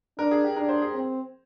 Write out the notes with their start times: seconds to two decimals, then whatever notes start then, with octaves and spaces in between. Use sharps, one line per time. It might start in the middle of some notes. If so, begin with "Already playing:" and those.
0.18 D4 A#4
0.31 G#4
0.44 G4
0.56 D4 A#4
0.69 C5
0.82 G#4
0.94 C4